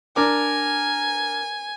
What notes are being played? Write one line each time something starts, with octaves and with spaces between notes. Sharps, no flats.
D4 A#4 G#5 D6